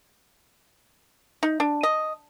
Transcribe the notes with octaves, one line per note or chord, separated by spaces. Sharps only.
D#4
D4
D#5